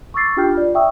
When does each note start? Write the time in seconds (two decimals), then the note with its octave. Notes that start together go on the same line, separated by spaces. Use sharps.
0.14 C#6 D6 E6 A6 C7
0.37 D4 F4 G4 G5 F6 G6
0.54 F4 D5
0.75 E5 G5 C#6 D#6 E6